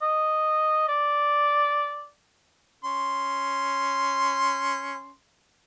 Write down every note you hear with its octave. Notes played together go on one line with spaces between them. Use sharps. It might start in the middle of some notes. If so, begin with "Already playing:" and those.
D#5
D5
C#4 C6